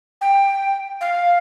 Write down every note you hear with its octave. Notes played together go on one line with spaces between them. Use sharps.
G5
F5